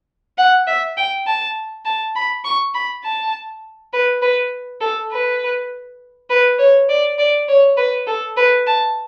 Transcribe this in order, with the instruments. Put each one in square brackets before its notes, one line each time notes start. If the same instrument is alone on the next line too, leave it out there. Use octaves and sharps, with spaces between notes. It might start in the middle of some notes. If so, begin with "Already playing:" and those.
[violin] F#5
E5
G5
A5
A5
B5
C#6
B5
A5
B4
B4
A4
B4
B4
C#5
D5
D5
C#5
B4
A4
B4
A5